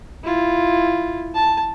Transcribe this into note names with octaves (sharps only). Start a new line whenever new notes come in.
E4 F4
A5